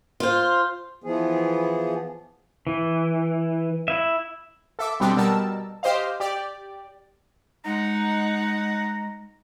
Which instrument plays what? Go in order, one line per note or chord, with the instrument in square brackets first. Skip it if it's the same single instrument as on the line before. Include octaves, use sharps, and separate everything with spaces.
[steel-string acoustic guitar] F4 C5
[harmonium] E3 F3 B3 G#4
[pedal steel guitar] E3
E4 E5
[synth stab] A4 E5 D6
B2 G3 C4 D4 G4 A4
B2 G3 A#4 A5 E6
G4 C5 D#5 F5
G4 D5
[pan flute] G#3 [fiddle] D#4 F#5 [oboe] A#5